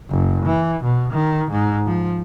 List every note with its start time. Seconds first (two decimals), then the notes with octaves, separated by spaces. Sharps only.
0.10 F#1
0.46 E3
0.84 B2
1.13 D#3
1.51 G#2
1.86 F3